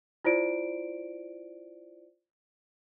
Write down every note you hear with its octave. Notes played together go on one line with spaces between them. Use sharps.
E4 F4 C5 D5 D7